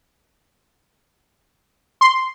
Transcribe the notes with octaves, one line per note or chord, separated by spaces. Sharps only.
C6